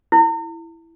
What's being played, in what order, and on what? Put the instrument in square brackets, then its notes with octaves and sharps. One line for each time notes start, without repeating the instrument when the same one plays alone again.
[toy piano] E4